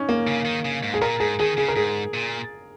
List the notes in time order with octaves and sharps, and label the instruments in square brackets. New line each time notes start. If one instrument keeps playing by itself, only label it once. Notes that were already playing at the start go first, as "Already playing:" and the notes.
Already playing: [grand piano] C#4 D#4
A#3
[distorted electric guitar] C#3
D#3
C#3
G#2
[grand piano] G#4
[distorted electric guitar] A#2 [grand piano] A#4
[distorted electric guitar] G#2 [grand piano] G#4
[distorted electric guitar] D#3 [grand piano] G#4
[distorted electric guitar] C#3 [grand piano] G#4
[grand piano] A#4
[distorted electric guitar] G#2 [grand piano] G#4
[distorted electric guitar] A#2